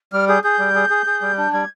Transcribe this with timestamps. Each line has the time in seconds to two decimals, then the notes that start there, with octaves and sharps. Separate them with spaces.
0.12 G3 F6
0.28 G#4 G6
0.43 G#4 G6
0.59 G3
0.75 G#4
0.90 G#4
1.06 G#4
1.22 G3
1.38 D4
1.52 G3 G#6